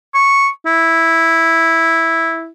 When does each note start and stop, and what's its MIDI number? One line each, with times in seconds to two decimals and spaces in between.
0.15 0.48 85
0.66 2.50 64